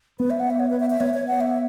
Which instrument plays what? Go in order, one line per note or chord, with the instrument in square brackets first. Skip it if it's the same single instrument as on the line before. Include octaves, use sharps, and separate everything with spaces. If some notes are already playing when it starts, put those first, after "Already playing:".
[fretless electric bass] B3 [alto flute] B4
[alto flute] E5
F#5
E5
C#5
B4
E5
E5
[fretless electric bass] B3 [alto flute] C#5
[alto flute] C#5
F#5
E5